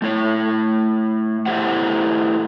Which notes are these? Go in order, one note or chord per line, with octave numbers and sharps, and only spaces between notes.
A3 E4 C#5
A3 E4 G4 C5 F#5